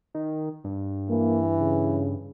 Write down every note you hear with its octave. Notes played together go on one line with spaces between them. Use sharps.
D#3
G2
E3 A#3
C#3